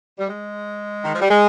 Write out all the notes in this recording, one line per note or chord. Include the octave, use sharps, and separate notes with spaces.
G3
G#3
D#3
F3
G3
G#3